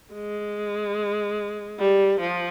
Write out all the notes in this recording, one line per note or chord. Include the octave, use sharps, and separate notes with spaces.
G#3
G3
F3